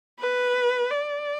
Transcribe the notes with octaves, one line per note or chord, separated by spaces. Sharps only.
B4
D5